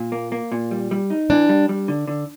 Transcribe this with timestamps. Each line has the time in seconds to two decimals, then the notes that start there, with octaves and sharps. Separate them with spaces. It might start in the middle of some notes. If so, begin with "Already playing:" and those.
Already playing: A#2
0.12 A#3
0.32 A#3
0.52 A#2
0.71 G3
0.91 G3
1.10 D#4
1.30 E3 D4
1.49 G3
1.69 G3
1.88 D3
2.08 D3